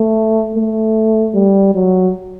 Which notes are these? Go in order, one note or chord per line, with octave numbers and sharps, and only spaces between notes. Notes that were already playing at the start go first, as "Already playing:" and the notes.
Already playing: A3
A3
G3
F#3